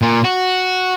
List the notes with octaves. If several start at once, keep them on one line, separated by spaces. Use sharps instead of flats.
A#2
F#4